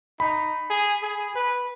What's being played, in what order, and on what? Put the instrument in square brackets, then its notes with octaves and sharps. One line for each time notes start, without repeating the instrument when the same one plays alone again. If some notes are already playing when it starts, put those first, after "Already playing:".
[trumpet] D#4 [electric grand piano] B5
[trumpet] G#4
G#4
B4